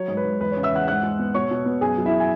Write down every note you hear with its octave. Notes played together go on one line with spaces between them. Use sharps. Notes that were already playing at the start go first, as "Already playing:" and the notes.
Already playing: F#3 C#5
G#2
B4
G#2
E2 B4
C#3 C#5
E5 E6
E2 F#5 F#6
G#2 F#5 F#6
G#3
B3
B2 C#5 C#6
B2
B3
F#2 G#4 G#5
F#3
E4 E5
G#5